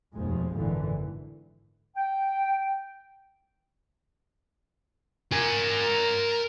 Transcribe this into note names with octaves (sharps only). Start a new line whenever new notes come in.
F1 D#2 B2 F3 G#3
G#1 F#2 A#2 D3 E3
G5
A#4 G#5